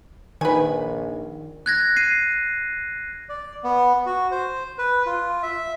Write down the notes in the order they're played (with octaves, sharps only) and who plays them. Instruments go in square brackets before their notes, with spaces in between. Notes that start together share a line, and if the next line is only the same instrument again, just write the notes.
[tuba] A#1 [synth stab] D#3 [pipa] B4 G#5
[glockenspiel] F#6 G#6 A#6
C7 D#7
[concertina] D5
B3
F#4
C5
B4
F4
E5